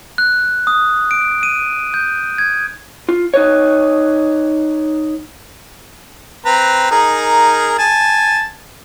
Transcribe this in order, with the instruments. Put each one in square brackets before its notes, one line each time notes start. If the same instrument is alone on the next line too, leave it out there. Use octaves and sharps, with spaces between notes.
[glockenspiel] F#6
D#6
D7
D#7
G6
G#6
[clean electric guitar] F4
D#4 B4 C#5
[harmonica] C4 B4 A#5
D#4 G#4 A#4
G#5 A5